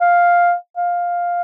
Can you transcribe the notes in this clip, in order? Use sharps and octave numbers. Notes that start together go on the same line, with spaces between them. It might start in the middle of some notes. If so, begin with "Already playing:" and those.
F5
F5